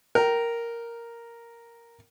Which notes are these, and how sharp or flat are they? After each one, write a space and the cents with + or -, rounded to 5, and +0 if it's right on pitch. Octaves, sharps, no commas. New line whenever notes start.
A#4 +0 G5 -20